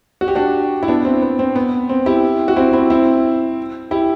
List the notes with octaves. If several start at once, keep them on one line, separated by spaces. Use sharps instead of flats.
F#4
G4
D4 F#4
E4
B3 D4
C4
B3
C4
B3
C4
E4 G4
F#4
C4 E4
C4 E4
C4 E4
E4 G4